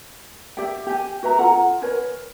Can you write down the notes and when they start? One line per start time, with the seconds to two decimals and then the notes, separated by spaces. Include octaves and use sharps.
0.57 G4 D5 E5 G5
0.87 G4 G#5
1.23 F#4 B4 E5 A#5
1.39 F4 A4 F#5 A#5
1.51 F4
1.82 A#4 B4 C#5 G#5